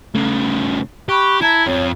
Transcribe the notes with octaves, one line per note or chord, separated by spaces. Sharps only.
C#3 A3
G4 B5 C#6 F#6
E4 A5 A#5 G#6
F2 C#5